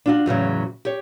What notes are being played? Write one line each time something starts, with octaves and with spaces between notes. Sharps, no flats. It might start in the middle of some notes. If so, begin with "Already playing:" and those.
D4 F4 F#4
E2 A2 C#3 F#3
G4 C#5